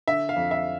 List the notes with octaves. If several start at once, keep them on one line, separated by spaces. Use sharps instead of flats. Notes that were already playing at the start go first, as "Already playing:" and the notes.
D3 E5
F5
F2
E5